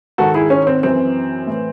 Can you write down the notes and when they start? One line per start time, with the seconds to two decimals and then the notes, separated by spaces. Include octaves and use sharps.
0.18 G#2 D#3 F#4 A4
0.34 E4 G#4
0.50 C#4
0.67 C4
0.83 F#2 E3 C4
1.47 A2 E3